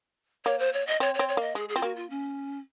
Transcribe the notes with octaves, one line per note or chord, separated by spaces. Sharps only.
A#3 C#5
C5
C#5
D#5
C4 C#5
C4 C#5
C#5
A#3 D#5
G#3 G#4
G#4
C4 F4
A#3 F#4
F4
C#4